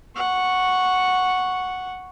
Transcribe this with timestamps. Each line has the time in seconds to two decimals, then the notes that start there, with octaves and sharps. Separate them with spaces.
0.16 F#5 C#6